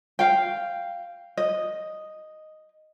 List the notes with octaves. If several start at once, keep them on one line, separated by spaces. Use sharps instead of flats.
F5 G5
D#5